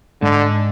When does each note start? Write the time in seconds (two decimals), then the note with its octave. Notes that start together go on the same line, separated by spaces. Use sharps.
0.22 G#2 D3